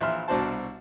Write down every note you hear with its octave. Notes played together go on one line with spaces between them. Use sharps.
A#1 E3 E5 C6 F6
C2 B2 D4 F#4 C5 A5